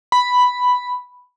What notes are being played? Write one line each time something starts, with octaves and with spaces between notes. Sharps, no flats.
B5